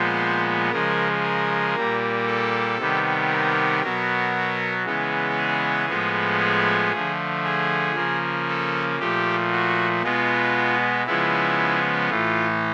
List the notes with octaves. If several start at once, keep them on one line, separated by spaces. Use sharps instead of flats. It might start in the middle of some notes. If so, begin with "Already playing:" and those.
Already playing: A#2 F3 G#3 B3 C5
C#3 F3 G#3 A#4
A#4
A#2 G3 A#3
A4
C3 D#3 G3 B3
A#4
B2 F#3 B3
C#3 E3 G#3 B3
G#4
A2 F3 G#3 B3
G#4
D3 F3 A3
G#4
C#3 F3 A#3
A4
A#2 F3 A3 G4
F#4
B2 G#3 B3 F4
C#3 F3 G#3 B3 E4
A2 E3 A3 F4